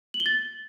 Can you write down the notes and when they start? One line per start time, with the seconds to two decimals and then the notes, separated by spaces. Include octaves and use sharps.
0.14 F#7
0.20 G7
0.26 A6